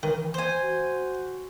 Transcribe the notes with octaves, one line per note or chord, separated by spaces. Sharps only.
D#3 E3
C5 G#5
F#4